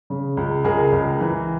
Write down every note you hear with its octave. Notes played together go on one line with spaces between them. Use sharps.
C#3
C#2
C#2 G#4 A#4
C#2
E3